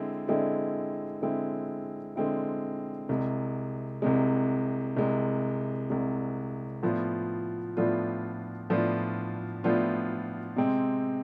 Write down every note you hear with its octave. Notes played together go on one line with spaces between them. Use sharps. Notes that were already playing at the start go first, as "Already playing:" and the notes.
Already playing: D3 G#3 C4 E4
D3 G#3 C4 E4
D3 G#3 C4 E4
D3 G#3 C4 E4
C2 C3 G#3
C2 C3 G#3
C2 C3 G#3
C2 C3 G#3
A2 F3 B3 D4 F4
A2 F3 B3 D4 F4
A2 F3 B3 D4 F4
A2 F3 B3 D4 F4
C3 G#3 C4